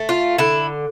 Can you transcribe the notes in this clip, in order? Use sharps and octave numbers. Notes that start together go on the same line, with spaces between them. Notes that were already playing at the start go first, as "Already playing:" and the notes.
Already playing: A3
F4
D3 E4